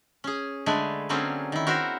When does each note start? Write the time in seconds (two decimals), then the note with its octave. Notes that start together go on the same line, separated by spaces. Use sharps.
0.24 C#4 G#4
0.66 D3 G#3 A3 B4 G#5
1.09 D3 F#3 A#3 C4 C#4 G#4
1.52 D#3 E4
1.67 F#4 A#4 C5 E5